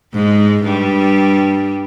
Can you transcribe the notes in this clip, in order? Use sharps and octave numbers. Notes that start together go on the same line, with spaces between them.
G#2 G#3
G2 G3